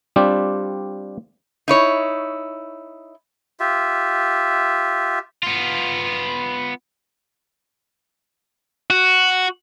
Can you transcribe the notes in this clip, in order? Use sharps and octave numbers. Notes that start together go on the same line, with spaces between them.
G3 C4 D4 F4 G4
D#4 E4 C#5
F4 G4 E5
B3 F4
F#4